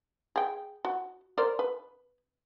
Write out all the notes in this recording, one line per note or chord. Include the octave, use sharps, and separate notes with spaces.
G#4 G5
F#4
A#4 C5 D5
B4